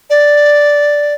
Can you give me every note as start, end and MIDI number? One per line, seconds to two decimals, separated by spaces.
0.10 1.14 74